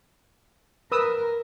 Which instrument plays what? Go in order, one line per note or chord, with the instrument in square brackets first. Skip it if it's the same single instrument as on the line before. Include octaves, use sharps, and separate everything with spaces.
[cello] A#4 [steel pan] B4 D#6 E6